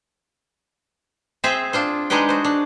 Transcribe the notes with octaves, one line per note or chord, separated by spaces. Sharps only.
C4 G#4 C5 E5
D4 F4 C5
G#3 D4 D#4 G#4 B4 G5
F#4 C5
D4